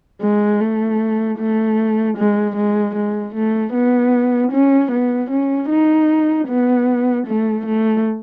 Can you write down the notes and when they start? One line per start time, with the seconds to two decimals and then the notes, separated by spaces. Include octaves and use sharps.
0.21 G#3
0.60 A3
1.39 A3
2.17 G#3
2.56 G#3
2.95 G#3
3.34 A3
3.73 B3
4.52 C#4
4.91 B3
5.30 C#4
5.70 D#4
6.48 B3
7.26 A3
7.65 A3